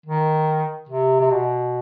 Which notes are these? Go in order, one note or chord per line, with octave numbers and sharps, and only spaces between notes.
D#3
C3
C3
B2